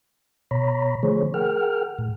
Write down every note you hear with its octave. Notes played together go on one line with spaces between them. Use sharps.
B2 C#5 A#5 B5
D3 F3 A3 G#4 C5 C#5
G#4 A#4 F#5 G5 F6
A2